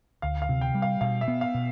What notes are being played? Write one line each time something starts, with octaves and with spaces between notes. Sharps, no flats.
D2 F5
F5
C3
G5
G3
F5
B2 F5
E5
B3
F5
B2